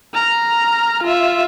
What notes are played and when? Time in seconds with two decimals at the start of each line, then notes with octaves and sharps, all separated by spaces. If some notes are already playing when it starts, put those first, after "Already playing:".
0.14 A#5 F6
1.03 F4 E5